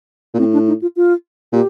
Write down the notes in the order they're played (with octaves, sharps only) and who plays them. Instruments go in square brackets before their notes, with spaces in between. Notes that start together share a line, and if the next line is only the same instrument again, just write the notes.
[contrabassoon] A#2
[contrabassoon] A2 [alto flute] C4
[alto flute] D4
D#4
F4
F4
[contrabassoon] A#2 [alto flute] G4